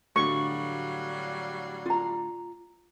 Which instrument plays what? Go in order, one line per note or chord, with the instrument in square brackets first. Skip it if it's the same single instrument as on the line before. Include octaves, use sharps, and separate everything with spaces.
[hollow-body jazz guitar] A2 D3 A3 [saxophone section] F#3 G3 F5 [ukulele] F#4 [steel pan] C#6
[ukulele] F4 A#5